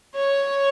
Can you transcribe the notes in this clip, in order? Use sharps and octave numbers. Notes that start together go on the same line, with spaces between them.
C#5